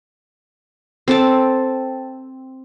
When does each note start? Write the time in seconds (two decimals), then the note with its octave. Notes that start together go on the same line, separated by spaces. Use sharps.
1.08 C4 A4 A5